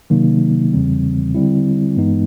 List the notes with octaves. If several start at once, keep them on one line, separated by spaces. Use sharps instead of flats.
C3 D#3 F#3 A#3 D#4
E2 C#3 E3 G3 C4
D3 G3 C4 E4
G2 E3 G#3 B3 D#4